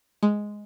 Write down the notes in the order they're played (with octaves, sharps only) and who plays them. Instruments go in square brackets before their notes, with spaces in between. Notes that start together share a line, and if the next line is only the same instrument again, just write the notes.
[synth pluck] G#3